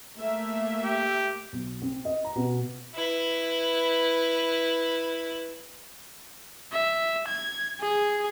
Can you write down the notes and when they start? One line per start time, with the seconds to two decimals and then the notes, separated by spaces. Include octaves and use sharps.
0.18 A3 A#3 E5
0.84 G4
1.53 B1
1.82 C4
2.05 D#5
2.24 A#5
2.36 B2
2.95 E4 B4
6.72 E5
7.28 G#6
7.81 G#4